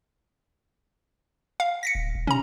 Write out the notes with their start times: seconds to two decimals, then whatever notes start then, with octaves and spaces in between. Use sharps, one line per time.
1.60 F5
1.83 A#6 B6 C#7
1.95 D1
2.15 D#1
2.27 C3 C#4 A#5